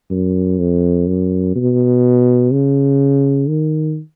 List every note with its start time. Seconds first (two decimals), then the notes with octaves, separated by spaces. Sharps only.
0.10 F#2
0.59 F2
1.07 F#2
1.55 B2
2.51 C#3
3.48 D#3